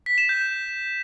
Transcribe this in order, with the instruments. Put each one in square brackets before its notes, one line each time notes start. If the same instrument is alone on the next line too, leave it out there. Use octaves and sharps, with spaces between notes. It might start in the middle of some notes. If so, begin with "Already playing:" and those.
[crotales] B6
E7
G6